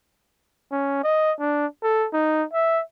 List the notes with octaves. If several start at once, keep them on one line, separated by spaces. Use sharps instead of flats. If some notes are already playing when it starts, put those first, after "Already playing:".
C#4
D#5
D4
A4
D#4
E5